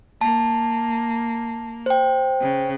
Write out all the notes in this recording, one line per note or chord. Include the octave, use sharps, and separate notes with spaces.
A#3 A5
C5 G5
C#3